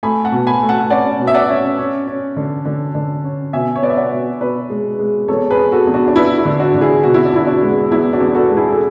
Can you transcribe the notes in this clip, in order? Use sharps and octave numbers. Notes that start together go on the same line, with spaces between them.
A3 G#5 B5
F#5 A5
B2
G#5 B5
A3
F#5 A5
C#4 D5 F#5
B2
E5
D5 F#5
C#4
C#4
C#4
D3
D3
D3
C#4
B2 E5 G#5
C#5
B3 D5
E5
D5 F#5
B2
B2 B4 D5
G#3
G#3
E2 A4 C#5
G#4 B4
B3
F#4 A4
E2
D4 F#4
D4
B3 E4
E4
D3
D4 F#4
D3
E4 G#4
B2 F#4
E4
D4
E2 E4
D4 F#4
G#3
E2 E4
D4 F#4
E2
F#4 A4
G#3
E4 G#4
A4